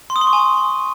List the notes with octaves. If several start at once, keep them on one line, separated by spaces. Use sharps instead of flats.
C6
D#6
C6
C#6
G#5